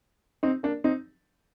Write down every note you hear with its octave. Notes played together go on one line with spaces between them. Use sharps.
C4 D#4
A#3 D4
C4 D#4